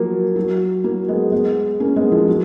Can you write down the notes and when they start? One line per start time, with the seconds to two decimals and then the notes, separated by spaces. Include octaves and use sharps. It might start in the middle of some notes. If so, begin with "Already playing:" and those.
Already playing: F3 F#3 A#3
0.36 F#3
0.84 F#3 A#3
1.08 G#3 B3
1.32 G#3 B3
1.80 A#3 C#4
1.96 G#3 B3
2.12 F3
2.28 F#3